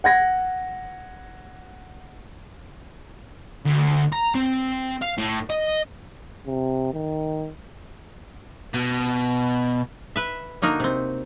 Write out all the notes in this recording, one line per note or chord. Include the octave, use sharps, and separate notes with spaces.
F#5 G#6 A#6
D2
A#5
C4
F5
A2
D#5
C3
D#3
B2
B4 E5
D3 A#3 D#4 F#4 A#4
C3 C4